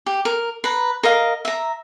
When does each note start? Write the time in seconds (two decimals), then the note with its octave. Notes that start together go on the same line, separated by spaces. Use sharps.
0.06 G4
0.25 A#4
0.64 B4 A#5
1.03 A#4 D#5 F5
1.45 E5 A#5